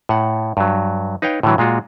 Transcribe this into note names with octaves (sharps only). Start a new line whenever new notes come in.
A2 F#5
G2 F#3
D#4 B4 C#5 F5 G5
A2 D3 E3 F#3
A#2 G#3 F4 F#4